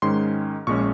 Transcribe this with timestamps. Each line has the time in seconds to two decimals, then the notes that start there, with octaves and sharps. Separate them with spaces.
0.02 G#2 D#3 G#3 C#4 C6
0.67 A#1 A#2 G#3 C#4 C#6